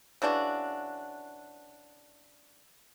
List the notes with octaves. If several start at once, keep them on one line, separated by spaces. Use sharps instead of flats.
C#3 E3 D4 F#4